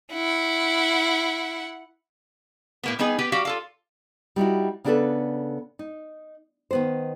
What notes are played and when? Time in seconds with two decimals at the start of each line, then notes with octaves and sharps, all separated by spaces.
0.13 E4 F#5
2.83 A2 A#3 B3
2.99 G3 B3 D#4 G#4
3.19 B3 G4 B4
3.32 G3 F#4 G4 F5
3.45 F4 A4 F5
4.36 G3 D#4 E4 F#4
4.84 C#3 B3 D4 G4 A4 B4
5.79 D#4
6.71 D#3 B3 C5